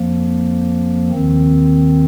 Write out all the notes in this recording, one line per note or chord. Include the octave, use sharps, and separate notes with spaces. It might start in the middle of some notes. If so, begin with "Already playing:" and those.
Already playing: F2 F3 A#3
D#2 D#3 C4